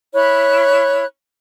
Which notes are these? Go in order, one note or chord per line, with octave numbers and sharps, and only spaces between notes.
E4 C#5 B5 F#6